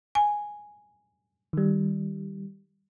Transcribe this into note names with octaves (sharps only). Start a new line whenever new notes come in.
G#5
D#3 G3